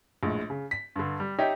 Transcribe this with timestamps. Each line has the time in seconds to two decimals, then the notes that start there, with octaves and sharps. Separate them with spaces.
0.23 A#1 A2 G#3
0.50 C#3
0.71 B6
0.96 G2 D3
1.20 G3
1.39 D#4 G4 C#5 E5